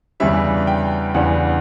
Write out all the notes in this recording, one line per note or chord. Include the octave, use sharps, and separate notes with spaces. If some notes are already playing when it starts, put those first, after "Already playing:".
E2 C#3 E3 G3 D4 E5
G5
E2 C#3 E3 G3 D4 F#5